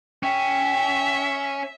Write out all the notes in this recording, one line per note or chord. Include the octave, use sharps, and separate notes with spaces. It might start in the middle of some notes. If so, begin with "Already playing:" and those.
C#4 E5 G5